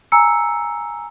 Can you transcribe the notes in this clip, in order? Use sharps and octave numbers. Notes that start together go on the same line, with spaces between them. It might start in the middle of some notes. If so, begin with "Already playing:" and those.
G#5 A#5 E6 C#7